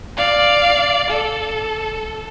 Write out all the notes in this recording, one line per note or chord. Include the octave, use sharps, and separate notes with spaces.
D5 F5
A4